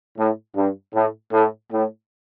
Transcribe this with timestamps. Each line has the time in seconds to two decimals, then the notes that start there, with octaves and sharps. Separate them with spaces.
0.17 A2
0.55 G2
0.93 A2
1.32 A2
1.71 A2